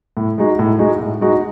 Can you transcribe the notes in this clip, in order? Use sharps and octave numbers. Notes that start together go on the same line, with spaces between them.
A2
G#3 D#4 F#4
A2
G#3 D#4 F#4
A2
G#3 D#4 F#4